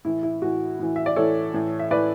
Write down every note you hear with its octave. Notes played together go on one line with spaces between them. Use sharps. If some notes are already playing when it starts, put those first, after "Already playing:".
A2 E3 E4
E4
A2 E3 F#4
A2 E3
E5
D5
A2 E3 A4 C#5
A2 E3
E5
A2 E3 B4 D5